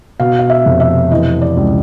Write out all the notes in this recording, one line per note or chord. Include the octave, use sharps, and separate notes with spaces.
B2 F5
F5
E5
F1
E5
E3 D#5
D5
C#2